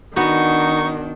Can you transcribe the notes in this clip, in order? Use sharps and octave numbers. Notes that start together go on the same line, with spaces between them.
D#3 B3 D4 D#4 F#4 C#6